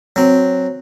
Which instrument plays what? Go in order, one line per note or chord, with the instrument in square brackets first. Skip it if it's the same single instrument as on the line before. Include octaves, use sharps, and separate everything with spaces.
[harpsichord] F#3 C4